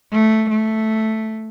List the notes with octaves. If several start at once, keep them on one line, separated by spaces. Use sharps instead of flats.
A3
A3